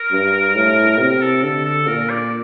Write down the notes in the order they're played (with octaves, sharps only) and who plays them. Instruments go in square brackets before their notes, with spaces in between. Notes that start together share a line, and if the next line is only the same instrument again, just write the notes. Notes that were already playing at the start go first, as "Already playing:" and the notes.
Already playing: [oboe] A#4
[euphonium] G2
A2
[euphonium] C3 [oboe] A#4
[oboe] A4
[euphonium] D3 [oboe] A4
[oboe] A4
[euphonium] A#2 [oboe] A#4
[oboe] D5